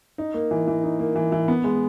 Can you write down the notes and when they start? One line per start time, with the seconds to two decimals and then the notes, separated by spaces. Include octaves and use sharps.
0.18 D#4
0.34 A#3
0.51 E3
0.68 E3
0.83 D#4
0.99 A#3
1.16 E3
1.32 E3
1.48 B3
1.64 G#3